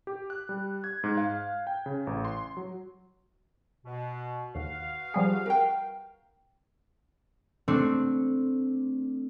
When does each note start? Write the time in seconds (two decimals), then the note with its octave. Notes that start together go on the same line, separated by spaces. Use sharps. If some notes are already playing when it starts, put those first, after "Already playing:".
0.07 G4
0.30 F#6
0.49 G3
0.84 G#6
1.04 G#2
1.17 F5
1.67 G5
1.86 C#3
2.07 A1
2.25 C6
2.57 F#3
3.84 B2
4.55 D#2 F#4 B4 F5
5.14 F3 G3 G#4
5.46 A#4 G5
7.68 A3 C4 D4